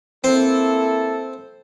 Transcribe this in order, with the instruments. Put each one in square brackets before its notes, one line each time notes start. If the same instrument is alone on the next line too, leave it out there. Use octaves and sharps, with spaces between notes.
[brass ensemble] A#3 E4 A4 [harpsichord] C4